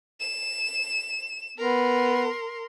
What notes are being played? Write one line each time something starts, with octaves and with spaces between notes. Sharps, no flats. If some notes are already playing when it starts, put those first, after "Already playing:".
E7
B3 A#4 C6